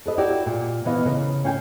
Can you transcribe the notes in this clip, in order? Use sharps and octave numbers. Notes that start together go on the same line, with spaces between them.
A4 B4 D#5
E4 F#4 G4 A#4 D5
A#2
E3 B3 D#5 F5
C#3 A#4
C#4 F5 G5 G#5